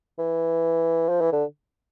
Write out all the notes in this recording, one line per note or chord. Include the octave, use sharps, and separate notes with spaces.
E3
F3
E3
D3